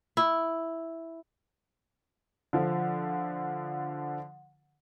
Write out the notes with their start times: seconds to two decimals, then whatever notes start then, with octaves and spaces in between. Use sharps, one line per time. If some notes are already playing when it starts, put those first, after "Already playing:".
0.17 E4
2.53 D3 F3